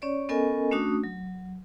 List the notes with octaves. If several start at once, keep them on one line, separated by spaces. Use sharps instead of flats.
C#4 C#5 D5
B3 C#4 A4 A#4 D#5 G#5
A3 C#4 D4 F#4 D#6
F#3